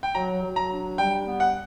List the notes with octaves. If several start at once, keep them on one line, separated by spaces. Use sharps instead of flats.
G5
F#3 A#5
F#3
A#5
D4
G3 G5
B3
F#5